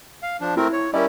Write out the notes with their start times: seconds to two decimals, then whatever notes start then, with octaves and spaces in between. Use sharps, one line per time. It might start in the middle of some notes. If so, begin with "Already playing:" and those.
0.23 F5
0.41 F3 D4
0.57 A3 C4 E4 A#4
0.73 C#5
0.94 G3 C#4 E4 A#4 D5